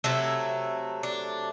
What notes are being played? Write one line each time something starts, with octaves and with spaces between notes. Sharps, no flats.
C3 F#3 A3 E4
D4